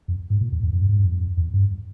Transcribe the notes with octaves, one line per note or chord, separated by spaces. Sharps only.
F2
G#2
A#2
E2
E2
F2
G2
G#2
G2
F2
E2
G2